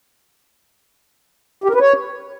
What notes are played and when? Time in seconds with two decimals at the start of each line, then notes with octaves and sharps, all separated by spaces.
1.64 G4
1.69 A#4
1.75 B4
1.80 C#5